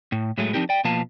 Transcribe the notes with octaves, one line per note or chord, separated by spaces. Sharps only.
A2
A2 F#3 G#3 A3
F3 C4 D4 D#4 G4 A#4
D5 G5
B2 F3 A#3 B4 F5 A5